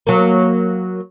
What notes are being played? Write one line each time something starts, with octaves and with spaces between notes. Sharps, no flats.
F#3 A#3